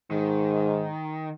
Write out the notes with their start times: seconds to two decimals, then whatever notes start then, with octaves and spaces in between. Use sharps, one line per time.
0.11 G#2 D#3